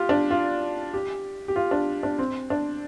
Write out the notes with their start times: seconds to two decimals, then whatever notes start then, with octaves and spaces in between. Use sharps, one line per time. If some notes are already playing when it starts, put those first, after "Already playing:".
Already playing: F4 G4
0.09 D4
0.31 F4
0.94 G4
1.48 G4
1.56 F4
1.71 D4
2.03 D4
2.19 C4
2.50 D4